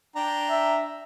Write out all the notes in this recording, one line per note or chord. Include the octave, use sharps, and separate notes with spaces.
D4 G5 A#5
E5